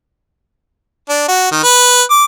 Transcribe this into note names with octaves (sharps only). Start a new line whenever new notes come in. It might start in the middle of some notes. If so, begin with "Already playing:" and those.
D4
F#4
D#3
B4
D6